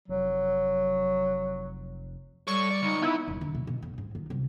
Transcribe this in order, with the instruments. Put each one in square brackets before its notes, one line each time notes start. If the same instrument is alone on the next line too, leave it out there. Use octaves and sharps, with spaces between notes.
[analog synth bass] F1 [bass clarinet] F#3
[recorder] G3 [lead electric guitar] A4 C#5 [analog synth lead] C#6
[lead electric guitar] B2 D5
[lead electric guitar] C#2 [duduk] D#4
[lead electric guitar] B3 [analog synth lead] E4
[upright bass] D#1
D3
B2
B2
F2
G#2
D#3
C2